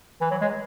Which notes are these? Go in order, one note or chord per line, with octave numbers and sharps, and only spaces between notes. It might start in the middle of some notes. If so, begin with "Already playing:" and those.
E3
F#3
G#3